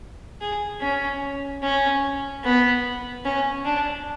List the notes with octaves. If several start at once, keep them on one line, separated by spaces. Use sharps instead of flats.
G#4
C#4
C#4
B3
C#4
D4